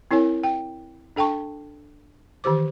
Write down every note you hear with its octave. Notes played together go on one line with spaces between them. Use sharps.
C4 E4 A#4 C#5 G#5
G5
D4 A4 G5 A5 C#6
D#3 E3 G4 C5 D6